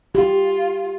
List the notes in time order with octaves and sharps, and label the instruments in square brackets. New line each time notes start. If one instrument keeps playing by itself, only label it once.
[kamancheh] F4 [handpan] G4